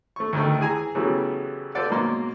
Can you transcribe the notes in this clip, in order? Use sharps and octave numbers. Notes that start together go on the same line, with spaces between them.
A3 C#6
D2 D#3 A3
E3 G#4 G#5 A#5
C#3 E3 F#3 G3 A3 B3
F4 A4 B4 C5 D5 F#5
G#2 B2 F#3 A#3 C6 D6